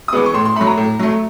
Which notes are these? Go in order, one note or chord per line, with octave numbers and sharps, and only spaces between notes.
D#6
E3 G#3 B3 D6
C#6
A2 C6
C6
F#3 A3 B5
A#5
A2
F#3 A3